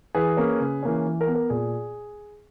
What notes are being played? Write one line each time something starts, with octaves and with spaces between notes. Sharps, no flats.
E3 G#4 B4
A#3 C#4
C#3
E3 A#3 C#4
E3
A#4
B3
A#4
A#2 G#4